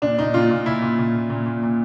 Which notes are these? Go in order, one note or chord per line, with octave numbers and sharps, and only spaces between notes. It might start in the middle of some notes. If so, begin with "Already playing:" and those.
A#2 D4
A#2 D#4
A#2 F4
A#2
A#2 E4
A#2
A#2
A#2
A#2
A#2
A#2